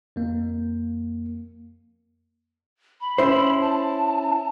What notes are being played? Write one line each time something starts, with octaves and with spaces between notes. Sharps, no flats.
F2 A#3
B5
C#4 E4 C5
A5